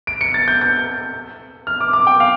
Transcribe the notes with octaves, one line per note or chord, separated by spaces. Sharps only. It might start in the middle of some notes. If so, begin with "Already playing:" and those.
D7
C#7
A6
G6
G6
F6
D6
D6
G5
F5